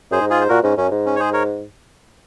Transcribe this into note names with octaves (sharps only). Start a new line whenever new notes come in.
F#2 G#4 C5
G#2
F4 G#4
C5
A#2 F#4 A#4
G#2 C#4
F#2 C#4
G#2
C#4
C#5
G#4 C5
A#4 C#5